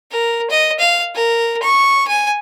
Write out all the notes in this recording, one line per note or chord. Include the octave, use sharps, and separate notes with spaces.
A#4
D#5
F5
A#4
C#6
G#5